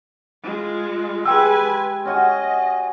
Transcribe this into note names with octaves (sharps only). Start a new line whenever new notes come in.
G#3 F4
G#3 G4 B4 G5 G#5 E6
C#4 F#4 D#5 G#5